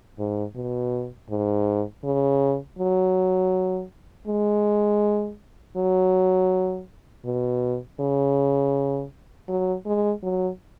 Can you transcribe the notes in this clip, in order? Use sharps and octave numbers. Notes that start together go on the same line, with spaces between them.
G#2
B2
G#2
C#3
F#3
G#3
F#3
B2
C#3
F#3
G#3
F#3